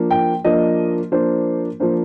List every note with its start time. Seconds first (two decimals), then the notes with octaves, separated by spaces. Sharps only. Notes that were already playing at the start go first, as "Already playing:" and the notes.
Already playing: F3 A#3 D4
0.11 G5
0.45 F3 A#3 D4 D#5
1.12 F3 A#3 D4 C5
1.80 F3 A#3 D4 C5